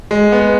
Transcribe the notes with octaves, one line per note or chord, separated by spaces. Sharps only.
G#3
B3